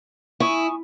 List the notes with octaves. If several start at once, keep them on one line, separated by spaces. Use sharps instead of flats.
E4 G#5 C#6 D#6